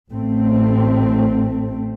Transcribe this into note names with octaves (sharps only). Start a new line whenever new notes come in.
A1 A3 C4